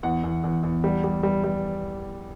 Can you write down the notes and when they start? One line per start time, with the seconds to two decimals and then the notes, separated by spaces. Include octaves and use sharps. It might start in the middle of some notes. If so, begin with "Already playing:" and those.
0.03 E2 F#5
0.24 E2
0.44 E2
0.63 E2
0.84 G3
1.04 G3
1.23 G3
1.44 G3